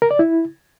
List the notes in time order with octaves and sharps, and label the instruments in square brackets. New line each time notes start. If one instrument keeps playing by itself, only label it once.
[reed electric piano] A#4
D5
E4